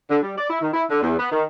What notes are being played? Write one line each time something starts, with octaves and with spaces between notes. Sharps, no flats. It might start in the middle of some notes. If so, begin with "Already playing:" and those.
D3
G3
D5
E4
D#3
E4
D3
E2
B3
D#3